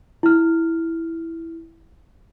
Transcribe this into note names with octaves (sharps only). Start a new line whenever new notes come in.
E4 F6